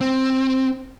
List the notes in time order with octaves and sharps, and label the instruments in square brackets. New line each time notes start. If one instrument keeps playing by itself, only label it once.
[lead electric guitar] C4